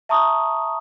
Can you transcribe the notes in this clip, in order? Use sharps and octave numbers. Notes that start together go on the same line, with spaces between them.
E5 A5 A#5 C#6 D#6